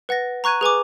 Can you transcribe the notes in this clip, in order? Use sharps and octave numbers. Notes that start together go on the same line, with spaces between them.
B4 F#5 A6 A#6
A#5 C#6 F#6 G#6 D#7
G#4 B4 G#5 D6